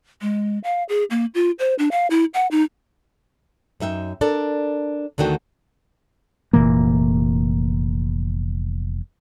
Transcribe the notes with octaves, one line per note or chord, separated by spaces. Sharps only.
G#3
F5
G#4
A#3
F4
C5
D4
F5
E4
F#5
D#4
F#2 D#4 E5 G5
D4 A4 A#4 D5
D2 D3 D#3 F#4 G5
F1 A#2 E3 A#3